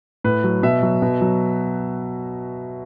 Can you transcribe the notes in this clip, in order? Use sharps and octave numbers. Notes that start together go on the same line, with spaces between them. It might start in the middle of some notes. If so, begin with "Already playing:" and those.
A2 B4
F#3
B2 E5
F#3
B2
F#3